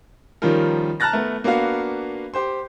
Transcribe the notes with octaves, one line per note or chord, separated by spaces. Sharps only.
D#3 F3 G3 C#4 F4 A#4
A5 A#5 F6 F#6 A6 A#6
A3 B3
A#3 B3 D4 F#4 F5
G4 C5 C6